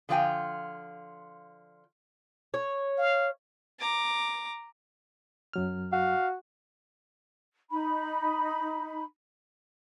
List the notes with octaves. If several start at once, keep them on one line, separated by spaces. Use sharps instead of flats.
D3 F3 F4 C#5 G5 G#5
C#5
F5
A#5 D6
F#2 F#3 F6
F#4 F5
D#4 B5